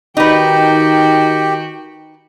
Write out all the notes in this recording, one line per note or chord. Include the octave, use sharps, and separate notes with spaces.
D#3 D#4 F#4 G4 B4 G5